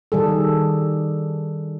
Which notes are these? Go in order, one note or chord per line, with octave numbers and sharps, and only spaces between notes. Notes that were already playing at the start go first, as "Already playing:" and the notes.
D#3 G3 G#4 A4